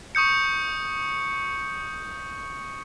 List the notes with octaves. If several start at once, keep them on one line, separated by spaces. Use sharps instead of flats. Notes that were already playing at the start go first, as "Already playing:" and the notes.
C#6 D#6 G6 C#7